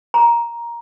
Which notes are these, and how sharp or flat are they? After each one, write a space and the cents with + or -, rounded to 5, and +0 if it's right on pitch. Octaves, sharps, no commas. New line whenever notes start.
A#5 +10